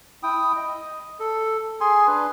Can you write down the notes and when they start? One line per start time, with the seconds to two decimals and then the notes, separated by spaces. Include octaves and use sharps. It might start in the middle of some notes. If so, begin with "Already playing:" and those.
0.23 E4 G5 D#6
0.56 D#5
1.20 A4
1.81 G#4 G#5 C6
2.07 D4 B4